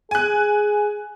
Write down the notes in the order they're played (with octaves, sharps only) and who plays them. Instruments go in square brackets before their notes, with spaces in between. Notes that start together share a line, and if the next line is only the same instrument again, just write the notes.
[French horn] G#4 [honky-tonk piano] G#5 F#6